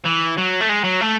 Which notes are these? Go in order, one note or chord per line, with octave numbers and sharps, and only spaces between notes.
E3
F#3
A3
G#3
F#3
A3